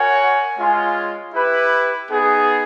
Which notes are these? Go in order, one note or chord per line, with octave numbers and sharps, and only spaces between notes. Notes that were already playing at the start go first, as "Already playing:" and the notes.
Already playing: F#4 A#4 C#5 F#5 G#5
G#3 C#4 F4
E4 G4 B4
B3 D#4 G#4